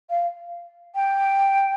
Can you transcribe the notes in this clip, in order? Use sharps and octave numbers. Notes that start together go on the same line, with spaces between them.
F5
G5